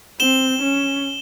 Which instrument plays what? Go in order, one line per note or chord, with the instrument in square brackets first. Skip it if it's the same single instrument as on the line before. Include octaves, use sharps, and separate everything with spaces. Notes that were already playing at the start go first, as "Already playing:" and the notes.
[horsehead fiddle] C4 [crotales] E7 G7
[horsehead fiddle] C#4